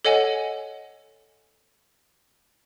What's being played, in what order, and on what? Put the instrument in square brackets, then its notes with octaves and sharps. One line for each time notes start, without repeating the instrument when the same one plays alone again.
[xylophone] A4 C#5 D#5 F#5 G#5